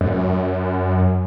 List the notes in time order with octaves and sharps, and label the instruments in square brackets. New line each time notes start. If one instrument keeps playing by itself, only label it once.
[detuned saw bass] F#2